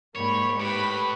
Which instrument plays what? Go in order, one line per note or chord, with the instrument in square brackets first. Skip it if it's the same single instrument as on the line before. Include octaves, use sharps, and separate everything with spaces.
[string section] G#2 G3 [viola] A#3 B5 [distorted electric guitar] C#5
[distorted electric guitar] A2 [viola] G4 B4 [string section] B5